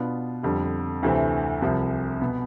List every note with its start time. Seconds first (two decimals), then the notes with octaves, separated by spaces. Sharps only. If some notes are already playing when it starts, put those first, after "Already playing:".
Already playing: B2 B3 D4 F4
0.43 F2 D3 G3
1.03 D2 C3 E3 A3 C4
1.62 C2 C3 F3
2.21 B2 B3